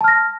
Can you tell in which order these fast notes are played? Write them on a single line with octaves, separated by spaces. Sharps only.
A5 F6 A#6